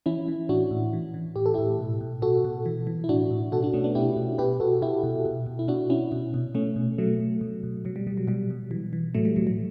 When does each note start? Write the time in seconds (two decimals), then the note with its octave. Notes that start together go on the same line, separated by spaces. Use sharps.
0.06 E3 C#4 E4
0.28 E3
0.49 A2 D4 F#4
0.71 A2
0.93 E3
1.14 E3
1.36 A2 G4
1.46 A4
1.54 A2 E4 G4
1.79 B2
2.01 B2
2.22 B2 F#4 A4
2.45 B2
2.66 E3
2.87 E3
3.04 E4
3.09 A2 D4 F#4
3.30 A2
3.52 B2 F#4 A4
3.62 D4 F#4
3.73 B2 A3 C#4
3.84 B3 D4
3.95 B2 E4 G4
4.17 B2
4.38 B2 G4 B4
4.60 B2 F#4 A4
4.82 B2 E4 G4
5.03 B2
5.25 B2
5.46 B2
5.59 E4
5.68 B2 D4 F#4
5.90 B2 C#4 E4
6.12 B2
6.34 B2
6.54 B2 A3 C#4
6.76 B2
6.98 B2 F#3 A3
7.20 B2
7.41 B2
7.63 B2
7.85 B2 F#3
7.96 G3
8.07 B2 G3
8.17 F#3
8.28 B2 G3
8.50 B2
8.71 E3
8.93 E3
9.15 A2 F#3 A3
9.25 G3
9.36 A2 F#3
9.47 F#3